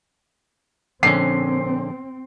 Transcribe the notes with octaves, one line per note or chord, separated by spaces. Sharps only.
A#1 D3 C4 C#4 C7